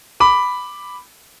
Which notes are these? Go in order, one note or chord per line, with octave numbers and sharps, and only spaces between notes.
B5 D6